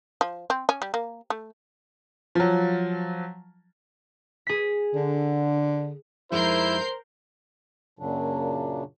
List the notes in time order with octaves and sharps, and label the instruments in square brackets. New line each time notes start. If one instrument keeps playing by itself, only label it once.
[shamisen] F3
C4
C#4
G3
A#3
A3
[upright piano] F3 F#3
[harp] G#4 B6
[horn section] D3
[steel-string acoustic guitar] F2 G#3 D#4 [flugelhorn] E4 [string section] A#4 G6 C7 [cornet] C5
[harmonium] F#2 A#2 C#3 F#3 D4